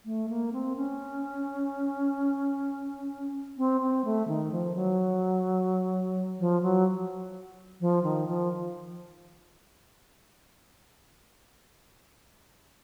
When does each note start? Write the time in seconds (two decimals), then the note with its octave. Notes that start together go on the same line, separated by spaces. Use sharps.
0.06 A3
0.29 A#3
0.53 C4
0.76 C#4
3.58 C4
3.81 C4
4.05 A3
4.28 D#3
4.52 F3
4.75 F#3
6.40 F3
6.63 F#3
7.81 F3
8.04 D#3
8.28 F3